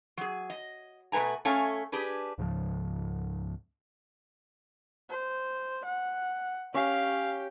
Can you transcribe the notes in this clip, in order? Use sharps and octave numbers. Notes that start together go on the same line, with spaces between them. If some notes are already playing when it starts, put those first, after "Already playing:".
F#3 G#4
D#5
B2 A3 B4 G#5 A#5
A3 C#4 A4 C#5 F5 G#5
D4 G4 G#4 B4
C#2 G#2 C#3 F3
C5
F#5
C#4 G4 F5